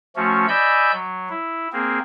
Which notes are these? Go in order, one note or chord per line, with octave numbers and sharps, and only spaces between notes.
F3 A3 C#4 F#4
D5 D#5 G#5 B5 E6 G6
F#3
E4
A#3 C4 G#4